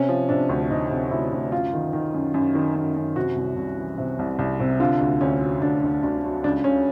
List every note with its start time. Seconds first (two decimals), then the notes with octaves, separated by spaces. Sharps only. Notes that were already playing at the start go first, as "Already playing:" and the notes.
Already playing: C3 C#4
0.09 F3
0.29 C3 D4
0.49 D2
0.70 C3 D#4
0.90 C3
1.11 D2 E4
1.32 D2
1.52 F#2 F4
1.73 D#3
1.93 D#3
2.14 F#2
2.34 F#2
2.55 D#3
2.76 F#2
2.96 F#2
3.16 C3 F#4
3.36 C2
3.57 C2
3.77 E3
3.98 C3
4.19 C2
4.39 C2
4.60 C3
4.80 D3 F4
5.01 D2
5.21 D2 C#4
5.41 F#3
5.62 D2 D4
5.83 D2
6.03 D2 D4
6.24 F#3
6.44 C#2 D4
6.64 C#3 C#4